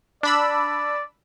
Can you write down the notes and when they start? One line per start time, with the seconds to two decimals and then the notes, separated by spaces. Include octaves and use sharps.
0.23 D4 D5 B5 E6